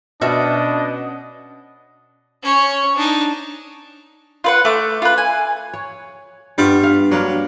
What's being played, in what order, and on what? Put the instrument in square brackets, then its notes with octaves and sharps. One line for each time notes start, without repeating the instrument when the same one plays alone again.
[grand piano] B2 [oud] C#4 F#4 E5 [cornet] D4 [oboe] D#5
[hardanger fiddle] C#4 C#5
D4 D#4
[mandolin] F4 B4 F#5
A3 D6
F4 B4
G#5
[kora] C#5
[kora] G2 B3 F4 [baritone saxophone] G3
[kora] F5
[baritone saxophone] F#3 [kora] G3 A#3 D4